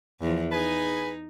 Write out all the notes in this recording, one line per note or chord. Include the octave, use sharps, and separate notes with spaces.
E2 F3
D#4 G#4 B4 G#5